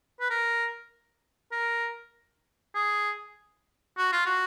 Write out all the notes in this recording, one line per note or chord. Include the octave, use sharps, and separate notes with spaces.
B4
A#4
A#4
G#4
F#4
F4
F#4